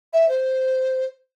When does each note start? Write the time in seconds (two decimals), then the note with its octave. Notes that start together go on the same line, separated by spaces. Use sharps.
0.13 E5
0.29 C5